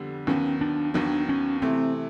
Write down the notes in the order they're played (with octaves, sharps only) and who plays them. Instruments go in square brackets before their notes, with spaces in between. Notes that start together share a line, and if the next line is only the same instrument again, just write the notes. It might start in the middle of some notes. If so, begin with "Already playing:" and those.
Already playing: [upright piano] F2 D3 G3 B3
[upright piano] D#2 D#3 F#3 B3 [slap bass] C#4
[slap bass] D4
[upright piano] D#2 D#3 F#3 B3 [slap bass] D4
[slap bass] C#4
[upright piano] C3 E3 A3 [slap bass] C4